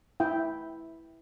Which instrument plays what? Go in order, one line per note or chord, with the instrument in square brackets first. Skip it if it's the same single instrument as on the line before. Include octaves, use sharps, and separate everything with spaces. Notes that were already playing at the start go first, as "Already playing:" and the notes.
[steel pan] E4 G5